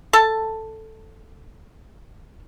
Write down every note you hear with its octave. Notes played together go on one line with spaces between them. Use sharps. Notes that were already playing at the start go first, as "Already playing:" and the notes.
A4 A5